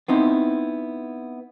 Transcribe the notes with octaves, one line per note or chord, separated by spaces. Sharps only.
B3 C4 D#4 E4